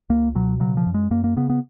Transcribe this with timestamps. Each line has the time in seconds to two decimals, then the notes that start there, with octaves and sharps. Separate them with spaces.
0.10 C#2 A#3
0.35 B2 F#3
0.60 C#3 F#3
0.77 F3
0.86 F#2
0.94 G#3
1.11 F#2 A#3
1.24 A#3
1.37 C#3 B3
1.50 B3